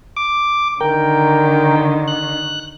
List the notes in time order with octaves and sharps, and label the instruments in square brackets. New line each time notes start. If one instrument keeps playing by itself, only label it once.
[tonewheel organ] D6
[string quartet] D3 D#3 [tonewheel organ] A#4 G5
[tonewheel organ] F#6